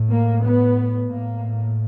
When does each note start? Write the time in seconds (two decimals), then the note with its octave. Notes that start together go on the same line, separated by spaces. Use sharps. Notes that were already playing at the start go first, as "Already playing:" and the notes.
Already playing: A2
0.12 A#3
0.45 B3
1.11 A2 A#3